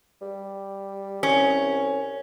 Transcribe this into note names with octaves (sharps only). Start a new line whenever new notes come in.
G3
C2 C#4